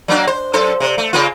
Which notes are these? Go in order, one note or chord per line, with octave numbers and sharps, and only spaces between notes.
F#3 A#3 D4
C5
F#2 A4 C5
C3
A3
C#3 A#3 F4